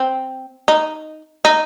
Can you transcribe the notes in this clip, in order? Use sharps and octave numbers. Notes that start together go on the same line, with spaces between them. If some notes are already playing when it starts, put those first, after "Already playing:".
Already playing: C4
D#4
D#4